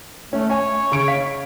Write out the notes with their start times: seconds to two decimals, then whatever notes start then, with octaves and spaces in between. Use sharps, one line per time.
0.33 A3 C#4
0.50 C#5 G#5
0.92 C#3 C#6 D7
1.08 F5 B6